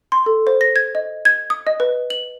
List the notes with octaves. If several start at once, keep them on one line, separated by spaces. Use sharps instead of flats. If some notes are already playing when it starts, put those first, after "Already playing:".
C6
A4
C5
A#6
G#6
D#5
G#6
D#6
D#5
B4
F#7